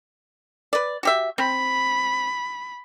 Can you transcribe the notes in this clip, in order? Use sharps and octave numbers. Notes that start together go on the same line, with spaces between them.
B4 D5
F#4 G4 E5
C4 B5